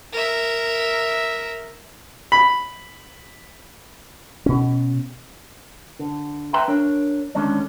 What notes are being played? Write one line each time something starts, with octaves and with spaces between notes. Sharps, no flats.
A#4 E5
B5
B2 C#4
D3
B4 E5 G5 A#5 C6
D4 A#4 C#5
D3 D#3 G#3 C#4 D4